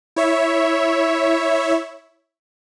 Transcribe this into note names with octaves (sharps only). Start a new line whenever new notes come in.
E4 C#5 E5